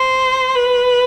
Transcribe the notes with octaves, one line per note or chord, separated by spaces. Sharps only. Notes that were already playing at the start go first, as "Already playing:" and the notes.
Already playing: C5
B4